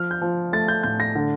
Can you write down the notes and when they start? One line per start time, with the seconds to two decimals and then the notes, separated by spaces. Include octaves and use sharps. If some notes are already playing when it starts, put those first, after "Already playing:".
Already playing: F3 F6
0.11 G6
0.22 F3
0.52 A3 A6
0.68 G6
0.83 A2 G6
1.00 A#6
1.15 D3